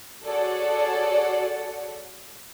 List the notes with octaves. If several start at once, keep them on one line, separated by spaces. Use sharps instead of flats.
F#4 G#4 A4 C#5 D5 F#5